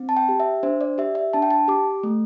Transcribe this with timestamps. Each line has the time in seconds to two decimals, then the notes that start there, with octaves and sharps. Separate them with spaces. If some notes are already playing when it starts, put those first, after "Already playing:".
Already playing: C4
0.09 A5
0.17 G5
0.29 G4
0.40 E5
0.63 D4 C5
0.81 D5
0.98 G4 E5
1.15 E5
1.33 D4 A5
1.42 G5
1.50 A5
1.68 G4 D6
2.03 A3